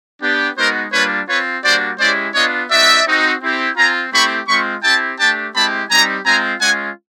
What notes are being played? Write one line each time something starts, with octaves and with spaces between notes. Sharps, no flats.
B3 D4 G4
G#3 B3 D#4 F#4 A#4 C5
G3 A#3 D4 F4 B4 C#5
C4 F4 B4 C#5
G3 A#3 D4 F#4 C5 D5
G#3 C#4 E4 G4 C5 D5
B3 D4 F4 C#5 D#5
B3 D#4 F#4 D5 E5
C4 D#4 F#4
C4 E4 G4
C4 F4 G#5 A#5
A3 C4 E4 G4 B5 C#6
G#3 C4 F4 B5 C#6
C4 E4 G4 G5 A5
A3 D4 G4 G5 A5
G#3 C4 E4 G4 A5 B5
G3 C4 D#4 G4 G#5 A#5
G#3 C4 F4 G#5 A#5
G#3 C#4 F4 F#5 G#5